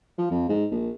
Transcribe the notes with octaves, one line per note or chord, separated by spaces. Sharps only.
F3
F2
G#2
A#1